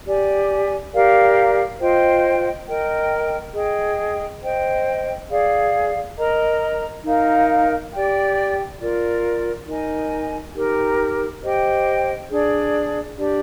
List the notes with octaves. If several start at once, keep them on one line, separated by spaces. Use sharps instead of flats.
G4 D5 G#5
G4 A#4 D5 F5
F4 C5 D#5 G5
A#4 D#5 G5
G#4 D#5 G5
C5 D#5 G5
G#4 D5 F5
A#4 D#5 A#5
D#4 A#4 F5
G4 D5 G5
F4 A#4 D5
D#4 A#4 D#5 G#5
D#4 G4 A#4
G4 C5 D#5 G5
D4 G#4 D5
D4 G4 D5